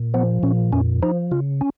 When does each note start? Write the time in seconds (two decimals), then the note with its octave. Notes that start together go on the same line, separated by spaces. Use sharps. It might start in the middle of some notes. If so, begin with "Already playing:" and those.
Already playing: A#2
0.14 F3 B3
0.43 A#2 C#4
0.73 F2 C#4
1.02 F3 D#4
1.31 C#3 F4
1.61 C#4